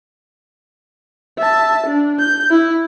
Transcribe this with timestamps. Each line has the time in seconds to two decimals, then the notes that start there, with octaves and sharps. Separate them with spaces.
1.38 E5 A5
1.86 D4
2.20 G6
2.50 E4